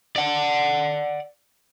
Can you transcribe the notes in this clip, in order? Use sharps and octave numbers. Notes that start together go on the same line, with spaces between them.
D5 F#5